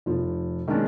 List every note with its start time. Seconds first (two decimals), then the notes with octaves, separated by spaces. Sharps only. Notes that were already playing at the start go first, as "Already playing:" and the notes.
0.06 F1 F3
0.68 D#3 G#3 A#3 C#4 D4